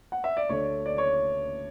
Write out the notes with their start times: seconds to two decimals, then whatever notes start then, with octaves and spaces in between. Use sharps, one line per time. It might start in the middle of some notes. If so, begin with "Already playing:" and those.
0.12 F#5
0.24 E5
0.37 D5
0.49 D2 D3 A3 C#5
0.86 D5
0.98 C#5